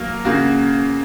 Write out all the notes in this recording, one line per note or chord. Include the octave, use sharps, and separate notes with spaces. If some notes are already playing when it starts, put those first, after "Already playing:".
Already playing: F#3 A#3 A#4
C#3 A#3 F#4